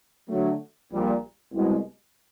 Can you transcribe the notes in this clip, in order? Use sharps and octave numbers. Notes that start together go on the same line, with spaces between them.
D3 F#3 A3
A#1 A#2 G3
C2 B2 G#3